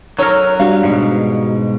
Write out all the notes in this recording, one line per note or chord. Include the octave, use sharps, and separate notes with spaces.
F#3 D#4 A4 A#4 C#5
G3 D4 F#4 F5
G#2 B2